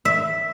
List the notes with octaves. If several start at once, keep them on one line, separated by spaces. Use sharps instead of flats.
E5